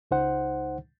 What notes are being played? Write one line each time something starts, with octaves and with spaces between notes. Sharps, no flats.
C#2 D#4 C5 F#5